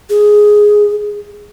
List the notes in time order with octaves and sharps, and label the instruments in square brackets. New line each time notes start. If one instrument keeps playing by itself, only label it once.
[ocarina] G#4